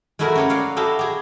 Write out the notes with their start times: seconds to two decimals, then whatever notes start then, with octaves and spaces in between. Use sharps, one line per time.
0.19 G#3 A3 E4 F#4 G#4 A#4
0.35 C#4 G4 C#5
0.49 A#4 D5 F5 F#5
0.76 E4 F#4 G4 A4 D#5 F5
0.99 G4 G#4